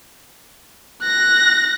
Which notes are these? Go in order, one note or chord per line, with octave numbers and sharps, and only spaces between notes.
F#6 A#6